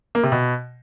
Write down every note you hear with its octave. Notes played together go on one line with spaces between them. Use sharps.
A#3
C3
B2